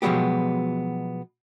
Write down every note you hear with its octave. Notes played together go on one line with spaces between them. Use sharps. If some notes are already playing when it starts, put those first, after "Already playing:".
B2 F3 F#3 G#3 B3 G4